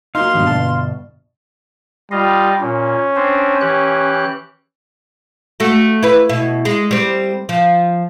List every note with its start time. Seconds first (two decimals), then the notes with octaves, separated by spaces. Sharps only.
0.15 F#3 A#3 D#4 F5 C6
0.34 G#1 G2 B2
0.47 G1 B2 A5
2.11 G3 F4 D#5 F5
2.61 A#2 C#4
3.16 C4 D4 C5
3.61 E3 G4 F#6
5.60 A3 F#4
6.03 E4 B4
6.29 B2 E4
6.65 G#3
6.91 G3 C4
7.49 F3